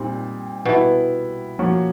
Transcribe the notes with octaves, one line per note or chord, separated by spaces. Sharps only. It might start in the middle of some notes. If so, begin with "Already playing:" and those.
Already playing: A#2 G3 C4 D#4
B2 G3 B3 E4
F3 A#3 C#4 F#4